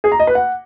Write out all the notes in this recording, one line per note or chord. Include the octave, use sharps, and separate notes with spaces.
G#4
A#5
D#5
B4
F#5